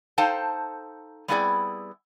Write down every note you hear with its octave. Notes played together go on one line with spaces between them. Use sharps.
D#4 A4 C5 F5 G5 A5
G3 B3 C4 E4 G#4 D5